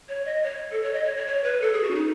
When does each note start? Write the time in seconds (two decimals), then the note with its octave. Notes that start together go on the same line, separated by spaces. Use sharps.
0.09 C#5
0.25 D#5
0.43 C#5
0.72 A4
0.83 C#5
0.93 D#5
1.05 C#5
1.17 C#5
1.27 C#5
1.44 B4
1.62 A4
1.73 G#4
1.83 F#4
1.91 C#4
1.95 D#4